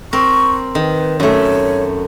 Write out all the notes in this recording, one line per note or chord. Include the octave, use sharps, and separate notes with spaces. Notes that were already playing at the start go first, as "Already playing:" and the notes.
C4 A#4 C#6
D#3 B4
F#2 A3 C#5